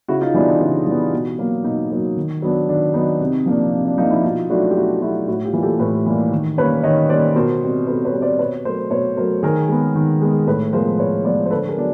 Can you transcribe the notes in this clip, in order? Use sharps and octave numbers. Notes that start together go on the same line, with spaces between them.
C#3 E4 F#4
D#4 F4
E3 G3 B3 D4 E4
D#4
C#3 D4
E3 G3 B3
B2
F#3 A#3
B2 D#4
F#3 A#3
D#3
F#3 B3 D4
D#3 D4
F#3 B3 D4 D#4
C3
F3 A#3 D4
C3
D4
F3 A#3 D4 D#4
E4
B2 D#4 F4
F#3 A3 D4 E4 F#4
G4
B2 E4 F#4
F#3 A3 D4 E4 F#4
A2 E4 F#4
F4 G4
E3 G3 A#3
G4 A4
A2 A4 B4
E3 G3 A#3
D#3
G3 A#3 C#4 B4 C#5
D#3 C#5 D#5
G3 A#3 C#4 C5 D5
B2 A#4 C5
G3 C4
B2 A4 B4
B4 C#5
G3 C4
C5 D5
B2 B4 C#5
F#3 A3 A#4 C5
B2 B4 C#5
F#3 A3 A#4 C5
D#3 G#4 A#4
G#3 B3
D#3
G#3 B3
A2 A4 B4
F3 G#3 B3 A#4 C5
A2 B4 C#5
F3 G#3 B3 C5 D5
C5
D3 A4 B4
G#4 A#4
F#3 B3 D4